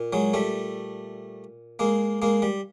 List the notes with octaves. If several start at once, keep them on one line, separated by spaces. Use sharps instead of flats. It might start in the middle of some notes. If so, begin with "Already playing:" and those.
Already playing: A#2
F#3 G#3
G3 A3
G#3 A#3
G#3 A#3
G3